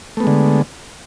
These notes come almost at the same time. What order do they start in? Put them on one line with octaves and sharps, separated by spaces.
A3 B3 G#3 D3